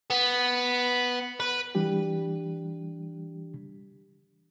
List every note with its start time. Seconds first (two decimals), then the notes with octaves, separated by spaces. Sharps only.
0.10 B3
1.40 B4
1.75 E3 G3 D4 G4